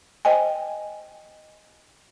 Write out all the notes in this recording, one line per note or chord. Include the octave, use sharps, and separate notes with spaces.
C5 D#5 G5 G#5